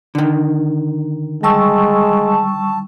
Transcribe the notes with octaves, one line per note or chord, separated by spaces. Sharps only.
D3 D#3
G3 G#3 A5 C#6 E6